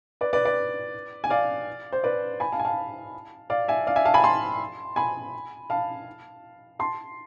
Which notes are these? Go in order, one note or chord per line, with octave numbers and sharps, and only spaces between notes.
B4 D5
B4 D5
B4 D5
G#5
D5 F5
C5
B4 D5
G#5 B5
F5 A5
G#5
F5 A5
D5 F5
E5 G#5
D5 F5
E5 G#5
F5 A5
G#5 B5
A5 C6
G#5 B5
F5 A5
A5 C6